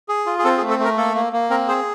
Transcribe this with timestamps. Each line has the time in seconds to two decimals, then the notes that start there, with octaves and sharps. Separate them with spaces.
0.09 G#4
0.26 F4
0.39 G#4
0.44 C4 A4
0.58 G#4
0.62 A3
0.70 A4
0.79 A3 A#4
0.97 A#3 A4
1.15 A#3
1.33 A#3
1.50 C4 A#4
1.68 G#4 C5